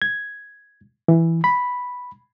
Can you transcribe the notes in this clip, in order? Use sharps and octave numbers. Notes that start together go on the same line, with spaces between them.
G#6
E3
B5